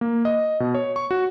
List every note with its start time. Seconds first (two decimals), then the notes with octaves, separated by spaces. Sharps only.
0.01 A#3
0.25 D#5
0.60 B2
0.75 C#5
0.96 C#6
1.11 F#4